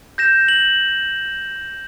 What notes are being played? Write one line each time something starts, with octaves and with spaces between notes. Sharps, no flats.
G6 A#6 E7
F#7